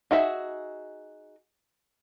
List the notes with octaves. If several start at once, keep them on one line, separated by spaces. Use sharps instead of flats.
D#4 F#4 G#4 E5